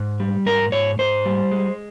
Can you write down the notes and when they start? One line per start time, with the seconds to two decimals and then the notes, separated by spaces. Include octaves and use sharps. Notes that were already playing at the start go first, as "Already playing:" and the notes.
Already playing: G#2
0.20 G3
0.46 G#2 A#4
0.72 G#2 C#5
0.99 G#2 C5
1.26 G3
1.52 G#3